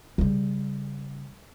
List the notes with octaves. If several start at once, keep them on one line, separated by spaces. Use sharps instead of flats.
C#3 G3